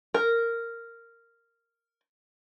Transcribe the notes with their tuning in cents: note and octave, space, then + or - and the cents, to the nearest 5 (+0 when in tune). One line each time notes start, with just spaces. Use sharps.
A#4 -10